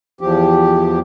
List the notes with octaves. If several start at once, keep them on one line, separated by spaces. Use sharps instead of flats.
E2 F3 G4